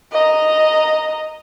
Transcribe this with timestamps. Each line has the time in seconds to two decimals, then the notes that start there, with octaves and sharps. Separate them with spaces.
0.12 D#5 A#5